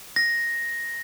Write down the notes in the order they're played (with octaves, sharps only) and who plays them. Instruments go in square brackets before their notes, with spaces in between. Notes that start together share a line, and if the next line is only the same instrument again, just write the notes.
[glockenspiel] A#6